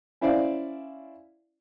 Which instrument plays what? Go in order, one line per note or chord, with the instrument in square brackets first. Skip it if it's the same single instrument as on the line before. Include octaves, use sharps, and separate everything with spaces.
[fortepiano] C#4 E4 C5 D5 F5